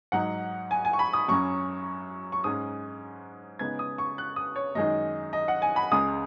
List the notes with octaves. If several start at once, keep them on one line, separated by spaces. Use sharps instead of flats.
G#2 F#3 D#4 F#5
G#5
G#5
C#6
B5
D#6
F#2 F#3 C#4 C#6
C#6
G#2 G#3 C#4 D#6
C#3 G#3 B3 D#4 G#6
D#6
C#6
F#6
D#6
C#5
F#2 D#3 G#3 D#4 D#5
D#5
F#5
G#5
B5
C#2 C#3 G#3 D#6